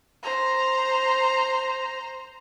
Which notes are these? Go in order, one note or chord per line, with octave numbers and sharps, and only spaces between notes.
C5 A#5